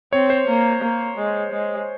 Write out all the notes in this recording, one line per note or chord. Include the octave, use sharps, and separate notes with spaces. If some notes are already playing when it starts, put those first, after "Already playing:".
C4 C#5
C5
A#3
A#3
G#3
G#3